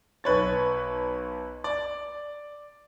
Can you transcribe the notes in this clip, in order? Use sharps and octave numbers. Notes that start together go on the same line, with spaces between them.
B1 B4 C#5 A6
D5